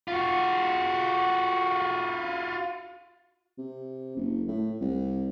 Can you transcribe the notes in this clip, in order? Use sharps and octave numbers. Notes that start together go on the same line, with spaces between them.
F4 F#4
C3
F#1
A2
C2